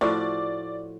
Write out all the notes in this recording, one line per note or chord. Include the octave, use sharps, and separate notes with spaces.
A2 F3 F#4 D5